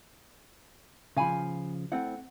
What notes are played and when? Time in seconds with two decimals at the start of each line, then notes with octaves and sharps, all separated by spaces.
1.17 C#3 F3 F5 G#5 B5
1.92 A3 C4 E4 F#5